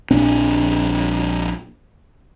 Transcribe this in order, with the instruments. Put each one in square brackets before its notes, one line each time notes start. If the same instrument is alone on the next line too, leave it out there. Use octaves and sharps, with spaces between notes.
[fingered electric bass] A#1 C4 D4